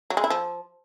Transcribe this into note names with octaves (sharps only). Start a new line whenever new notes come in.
F#3
G#3
E4
F3